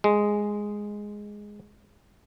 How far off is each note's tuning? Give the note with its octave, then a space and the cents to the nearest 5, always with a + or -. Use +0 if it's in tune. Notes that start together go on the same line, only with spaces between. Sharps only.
G#3 -5